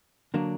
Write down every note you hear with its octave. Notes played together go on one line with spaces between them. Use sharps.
D3 F#3 A#3 D4